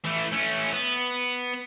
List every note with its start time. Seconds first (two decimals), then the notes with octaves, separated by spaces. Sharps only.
0.05 E3 A3
0.32 A3 C#4
0.73 B3